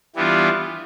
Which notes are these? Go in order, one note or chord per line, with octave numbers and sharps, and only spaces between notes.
E3 G3 B3 D4 F4